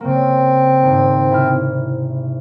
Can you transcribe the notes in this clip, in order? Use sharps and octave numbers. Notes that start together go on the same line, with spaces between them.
C#3 A#3 C4
G#1 G#2
C3 E4 F6